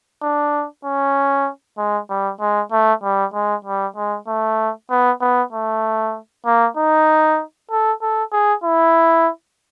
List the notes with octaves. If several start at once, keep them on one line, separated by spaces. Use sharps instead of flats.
D4
C#4
G#3
G3
G#3
A3
G3
G#3
G3
G#3
A3
B3
B3
A3
A#3
D#4
A4
A4
G#4
E4